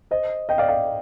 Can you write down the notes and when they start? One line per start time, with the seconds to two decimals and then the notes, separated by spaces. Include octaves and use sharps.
0.11 C5 D#5
0.49 D#5 G5
0.58 D5 F5
0.69 D5 F5